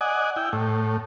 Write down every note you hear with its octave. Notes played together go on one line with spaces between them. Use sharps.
D5 D#5 F#5 G#5
E4 G5
A2